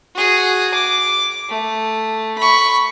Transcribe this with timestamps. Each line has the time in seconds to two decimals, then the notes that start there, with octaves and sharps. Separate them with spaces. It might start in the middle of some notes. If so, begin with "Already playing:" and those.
0.15 F#4 G#4
0.74 D6
1.49 A3
2.39 B5 C#6